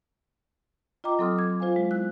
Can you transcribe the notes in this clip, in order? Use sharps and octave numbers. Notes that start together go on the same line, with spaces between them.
F4 D#5 G5 A#5 D6
F#3 C4 A4 C6 D#6 F6
D6 G#6
F4 C5 F5 G#5
G#3
B3 E4 F#6